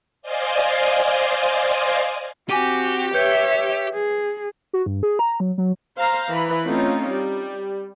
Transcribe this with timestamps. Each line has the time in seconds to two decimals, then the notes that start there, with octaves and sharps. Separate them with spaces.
0.22 C5 D5 D#5 F5 G#5 C6
2.49 C4 F#4 G4 G#5 D6 D#7
3.14 B4 C#5 E5 G6 C#7
3.93 G#4
4.73 F#4
4.86 G2
5.03 G#4
5.19 A#5
5.40 F#3
5.58 F#3
5.97 C5 F5 A#5
6.30 E3 B4 B5
6.65 A3 C4 C#4 D#4 F4
7.09 G3